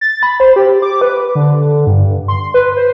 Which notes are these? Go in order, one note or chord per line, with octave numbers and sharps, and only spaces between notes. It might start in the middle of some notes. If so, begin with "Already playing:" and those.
A6
B5
C5
G4
D6
B4
D3
G2
C6
B4
C5